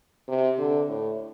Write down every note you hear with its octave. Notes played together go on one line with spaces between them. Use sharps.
C3
D3
A2